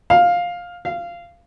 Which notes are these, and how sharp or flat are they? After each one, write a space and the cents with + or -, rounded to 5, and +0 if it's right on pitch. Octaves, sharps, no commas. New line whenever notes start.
F5 +10
F5 -15